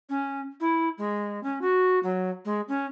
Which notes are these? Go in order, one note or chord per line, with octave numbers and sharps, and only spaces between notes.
C#4
E4
G#3
C#4
F#4
F#3
G#3
C#4